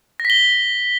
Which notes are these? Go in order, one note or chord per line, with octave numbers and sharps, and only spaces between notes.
A#6
B6
G7